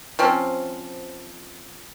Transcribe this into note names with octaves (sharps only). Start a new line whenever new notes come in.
F3 C4 C#4